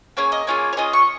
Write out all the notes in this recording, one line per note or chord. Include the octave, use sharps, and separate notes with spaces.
A#3 C#4 G#4 C#5
D#5
A#3 C#4 F4 G#4 C#5
C#5
C#4 F4 G#4 D#5
C#6